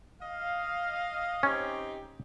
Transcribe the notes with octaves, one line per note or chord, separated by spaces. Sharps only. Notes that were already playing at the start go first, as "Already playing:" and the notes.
D#5 F5
C4 C#4 D#4 G4